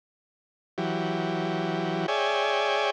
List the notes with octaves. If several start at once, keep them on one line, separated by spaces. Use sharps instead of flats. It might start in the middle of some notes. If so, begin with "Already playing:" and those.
E3 F#3 G4
G#4 C#5 D5 E5 G5 G#5